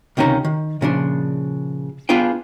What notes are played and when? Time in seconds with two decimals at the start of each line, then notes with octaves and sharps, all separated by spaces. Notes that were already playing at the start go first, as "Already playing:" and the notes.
0.17 C#2 C3 D#3 C#4 A#5
0.45 D#3
0.81 A#2 C#3 F3 D4
2.09 B3 D4 F4 G#4 B4 G5